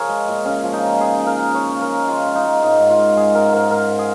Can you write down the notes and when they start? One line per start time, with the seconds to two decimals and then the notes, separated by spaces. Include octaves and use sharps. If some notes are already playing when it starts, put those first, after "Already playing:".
Already playing: F3 G#4 A#4 C#5
0.09 G#3
0.28 A#2
0.45 C#3 C#4
0.64 F3
0.73 D#4
0.82 C#3
1.00 C#3 G#4
1.18 C#3
1.27 A#4
1.36 C#3
1.54 C#3 C#5
1.72 C#3
1.81 A#4
1.90 G#3
2.08 G#3 F4
2.26 C#3
2.35 D#4
2.45 G#3
2.62 G#2 D#4
2.80 G#2
2.90 F4
2.99 G#3
3.17 G#2 G#4
3.34 G#2 A#4
3.53 G#2 A#4
3.71 G#2 A#4
3.89 G#2
3.99 G#4